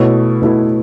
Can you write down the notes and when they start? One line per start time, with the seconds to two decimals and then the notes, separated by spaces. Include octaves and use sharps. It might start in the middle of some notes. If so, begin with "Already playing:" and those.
Already playing: B2 A3 E4 C#5
0.42 B2 A3 E4